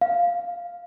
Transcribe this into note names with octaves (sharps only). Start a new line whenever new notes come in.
F5